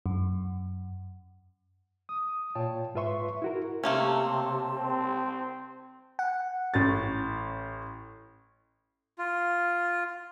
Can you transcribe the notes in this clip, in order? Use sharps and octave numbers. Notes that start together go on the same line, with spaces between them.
F#2
D#6
A#2 F4 C#5 G5 A5
G#2 F4 B4 E5 C6 C#6
E4 F#4 A#4
C3 A3 A#3 C#4 G4 A5 C6
C4
F#5
A1 C#4 A6
F4